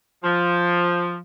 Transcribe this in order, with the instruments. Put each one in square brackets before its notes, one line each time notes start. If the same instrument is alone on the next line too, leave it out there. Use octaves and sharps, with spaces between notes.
[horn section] F3